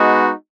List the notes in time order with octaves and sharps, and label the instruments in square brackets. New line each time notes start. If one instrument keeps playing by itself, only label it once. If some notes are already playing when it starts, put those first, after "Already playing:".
Already playing: [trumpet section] G#3 B3 D#4 F#4